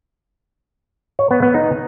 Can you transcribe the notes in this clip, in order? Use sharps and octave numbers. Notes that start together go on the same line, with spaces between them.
C#5
B3
B3
D#4